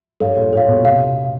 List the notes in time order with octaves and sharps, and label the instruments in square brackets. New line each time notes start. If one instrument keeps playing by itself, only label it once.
[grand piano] G2 [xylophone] A4 C#5 F5
[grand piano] A#2
[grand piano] A#2 [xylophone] A4 C#5 F5
[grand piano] A#2
B2
[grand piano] C3 [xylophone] F5